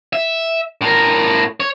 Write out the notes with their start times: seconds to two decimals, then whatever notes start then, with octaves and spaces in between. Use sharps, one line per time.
0.13 E5
0.81 A2 A#4
1.60 C#5